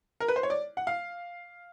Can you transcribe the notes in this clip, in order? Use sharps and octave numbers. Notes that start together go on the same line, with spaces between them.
A#4
B4
C5
C#5
D5
F#5
F5